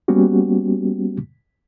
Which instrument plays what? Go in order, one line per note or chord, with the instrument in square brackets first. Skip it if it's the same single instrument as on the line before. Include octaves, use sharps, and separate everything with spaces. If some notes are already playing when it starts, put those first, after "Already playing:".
[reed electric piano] G3 A#3 B3 C#4 F#4 G4